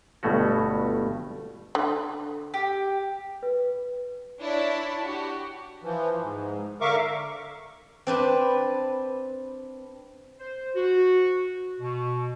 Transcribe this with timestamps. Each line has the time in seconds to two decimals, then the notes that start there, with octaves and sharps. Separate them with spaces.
0.23 G1 G2 B2 A3 C#4 F#4
1.75 D3
2.54 G4
3.43 B4
4.41 D4 E4 C#5 A5 B5
5.03 F#4 G4
5.84 E3 F3
6.20 G#2
6.81 D3 A#4 E5 F5 C#6 D6
8.07 C4 D4 B4
10.40 C5
10.76 F#4
11.81 B2